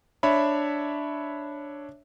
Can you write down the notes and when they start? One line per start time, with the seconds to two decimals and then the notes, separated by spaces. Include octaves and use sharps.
0.23 D4 C#5 E5 B5